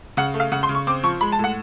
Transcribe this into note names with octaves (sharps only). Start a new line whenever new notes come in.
C#3 F#5
A3
F5
C#3 F#5
C6
C#3
C#6
C4 D6
F3 C#6
G#3 B5
A5
A2 F#5